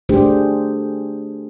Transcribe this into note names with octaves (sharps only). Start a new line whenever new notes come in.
A3 D4 G4 G#4 C5